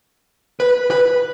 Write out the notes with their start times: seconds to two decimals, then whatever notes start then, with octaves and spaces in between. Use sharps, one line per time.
0.60 B4
0.91 B4